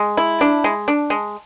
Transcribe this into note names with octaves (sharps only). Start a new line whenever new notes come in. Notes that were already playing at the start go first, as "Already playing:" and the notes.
Already playing: G#3
E4
D4
G#3
D4
G#3